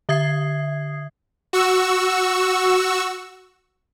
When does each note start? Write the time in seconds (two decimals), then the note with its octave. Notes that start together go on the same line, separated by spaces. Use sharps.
0.09 D3 E5 D#6 G#6 C7
1.53 F#4 C#6 E6